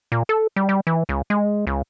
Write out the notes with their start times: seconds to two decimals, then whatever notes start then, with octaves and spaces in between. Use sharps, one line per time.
0.12 A#2
0.29 A4
0.56 G3
0.69 G3
0.87 E3
1.09 C#2
1.30 G#3
1.67 C#2